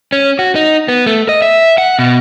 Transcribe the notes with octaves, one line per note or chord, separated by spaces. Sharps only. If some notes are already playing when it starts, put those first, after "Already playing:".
C#4
F#4
D#4
B3
A3
D#5
E5
F#5
B2